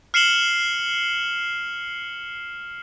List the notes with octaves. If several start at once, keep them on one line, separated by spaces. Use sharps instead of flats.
F6 C7 C#7 E7 F#7 G7